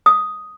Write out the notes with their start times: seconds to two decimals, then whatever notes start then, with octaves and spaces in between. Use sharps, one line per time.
0.06 D#6